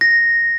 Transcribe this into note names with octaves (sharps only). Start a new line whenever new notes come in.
A#6